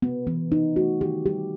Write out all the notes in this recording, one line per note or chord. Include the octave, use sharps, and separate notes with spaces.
C3 B3
E3 B3
C3 D#4
A3 F#4
D#3 G4
G3 G4